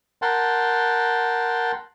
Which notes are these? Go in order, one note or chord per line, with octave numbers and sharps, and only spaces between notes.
A#4 F#5 G5 A5 C6